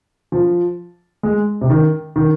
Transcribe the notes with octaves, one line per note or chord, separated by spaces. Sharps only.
F3
G#3
C3
D#3
D#3